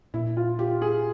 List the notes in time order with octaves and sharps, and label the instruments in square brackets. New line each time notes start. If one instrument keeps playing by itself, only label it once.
[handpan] A#2 [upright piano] E4
[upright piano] F4
[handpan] F4 [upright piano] G4
[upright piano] G#4